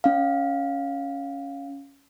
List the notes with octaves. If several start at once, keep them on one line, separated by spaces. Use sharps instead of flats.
C#4 F5